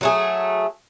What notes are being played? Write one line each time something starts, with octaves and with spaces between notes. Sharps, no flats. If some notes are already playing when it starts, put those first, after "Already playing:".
F#3 A3 G#4